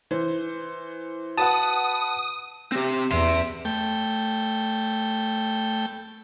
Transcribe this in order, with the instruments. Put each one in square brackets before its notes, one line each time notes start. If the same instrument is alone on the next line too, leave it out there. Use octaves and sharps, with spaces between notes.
[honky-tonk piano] E3 C5
[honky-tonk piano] F#4 B4 F#5 [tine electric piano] A5 [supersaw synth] D#6
[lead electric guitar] C4 G4
[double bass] E2 [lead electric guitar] E5 C6
[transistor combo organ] A3 G5